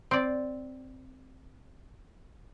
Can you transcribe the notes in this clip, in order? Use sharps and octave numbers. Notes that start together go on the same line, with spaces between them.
C4 D5